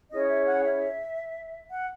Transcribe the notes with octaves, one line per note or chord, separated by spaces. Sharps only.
C#4 E4 G#4 C#5 D#5
E5
F#5
E5
F#5